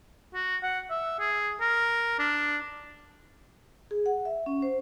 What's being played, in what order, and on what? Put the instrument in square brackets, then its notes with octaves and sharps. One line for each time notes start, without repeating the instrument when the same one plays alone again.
[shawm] F#4
F#5
E5
G#4
A#4
D4
[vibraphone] G#4
F#5
E5
C#4
C5